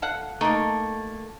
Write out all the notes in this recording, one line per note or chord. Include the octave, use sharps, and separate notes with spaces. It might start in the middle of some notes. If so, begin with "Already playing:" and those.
A4 F5 F#5
A3 A#3 D#4